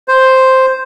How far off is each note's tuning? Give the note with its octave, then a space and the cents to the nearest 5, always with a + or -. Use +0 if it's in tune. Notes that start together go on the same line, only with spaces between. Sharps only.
C5 +0